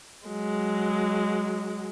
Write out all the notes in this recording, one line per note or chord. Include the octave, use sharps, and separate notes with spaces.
F#3 G#3